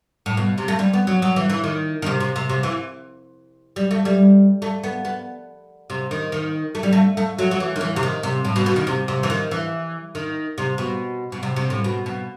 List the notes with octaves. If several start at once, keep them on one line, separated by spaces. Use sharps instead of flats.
A2
B2
C3
A3
G3
B3
F#3
F#3
E3
E3
D#3
D#3
C3
C3
C3
C3
E3
G3
A3
G3
A3
B3
B3
C3
D#3
D#3
A3
G3
A3
A3
F#3
F#3
E3
D#3
E3
C3
D#3
C3
A2
B2
B2
D#3
C3
C3
E3
D#3
E3
D#3
C3
B2
B2
C3
C3
A2
B2
B2